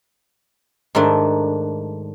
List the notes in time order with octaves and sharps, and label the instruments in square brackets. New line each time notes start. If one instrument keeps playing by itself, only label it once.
[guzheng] G#2 D#3 A3 D4